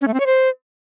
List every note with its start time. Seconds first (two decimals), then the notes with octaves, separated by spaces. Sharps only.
0.01 C#4
0.08 A3
0.14 C4
0.20 C#5
0.26 C5